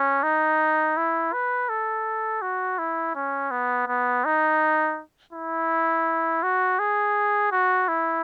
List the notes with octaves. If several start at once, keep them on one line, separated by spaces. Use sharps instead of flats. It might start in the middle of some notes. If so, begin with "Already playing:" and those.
Already playing: C#4
D#4
E4
B4
A4
F#4
E4
C#4
B3
B3
D#4
E4
F#4
G#4
F#4
E4